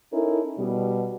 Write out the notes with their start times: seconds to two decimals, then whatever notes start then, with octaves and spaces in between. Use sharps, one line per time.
0.13 C#4 D#4 E4 A4 A#4
0.58 B2 G3